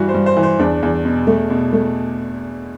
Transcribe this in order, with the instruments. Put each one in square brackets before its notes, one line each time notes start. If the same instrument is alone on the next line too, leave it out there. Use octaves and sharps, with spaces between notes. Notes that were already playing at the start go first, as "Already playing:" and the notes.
Already playing: [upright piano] G2 E3 F#4
C5
G2
C5
E3
C5
E2 D4
E2
B2
A3
B2
A3